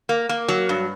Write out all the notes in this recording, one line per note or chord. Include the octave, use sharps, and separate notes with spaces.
A#3
A#3
F#3
G2